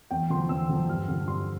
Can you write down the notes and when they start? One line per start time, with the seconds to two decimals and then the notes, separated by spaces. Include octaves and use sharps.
0.11 E2 G5
0.30 D3 F3 C6
0.49 E2 E6
0.69 D3 F3
0.89 G2 F6
1.08 D3 F3
1.28 G2 C6